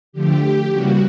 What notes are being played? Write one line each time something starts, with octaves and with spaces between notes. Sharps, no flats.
D3 F3 A3 G4
C#3 E3 G3 A#3 F#4